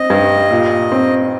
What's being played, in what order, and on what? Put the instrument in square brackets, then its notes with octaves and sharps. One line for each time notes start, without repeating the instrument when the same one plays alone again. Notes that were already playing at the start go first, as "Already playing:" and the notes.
Already playing: [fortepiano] C4 [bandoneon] D#5
[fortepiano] G2
A#2
C4